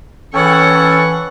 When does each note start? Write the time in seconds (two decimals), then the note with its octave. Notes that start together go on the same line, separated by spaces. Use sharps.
0.34 E3 C#4 G#4 A4 C#5 F#5 G5 C#6
0.69 A5